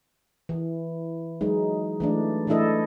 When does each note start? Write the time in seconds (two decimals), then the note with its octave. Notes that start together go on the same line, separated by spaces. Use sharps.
0.49 E3
1.41 F#3 G#3 D#4
2.00 E3 A3 D4
2.47 E3 A3 D4 E4 A4 D#5